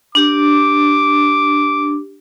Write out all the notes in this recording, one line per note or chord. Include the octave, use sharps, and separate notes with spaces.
D4 G4 D6